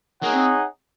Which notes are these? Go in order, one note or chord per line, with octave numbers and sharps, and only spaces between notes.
A#3 D#4 G#4 C#5 F#5
C4